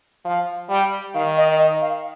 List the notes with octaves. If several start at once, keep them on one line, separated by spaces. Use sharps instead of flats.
F3 F5
G3 G5
D#3 F5
D#5
D#5
F5